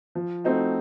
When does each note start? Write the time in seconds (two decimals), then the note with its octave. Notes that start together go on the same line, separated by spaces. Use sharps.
0.15 F3
0.44 A3 C4 D#4 F#4